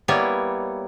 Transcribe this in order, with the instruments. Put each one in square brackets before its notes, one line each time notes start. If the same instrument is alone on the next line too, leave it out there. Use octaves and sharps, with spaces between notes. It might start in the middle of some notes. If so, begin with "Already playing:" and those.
[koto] G3 A#3 B3 E4 C#5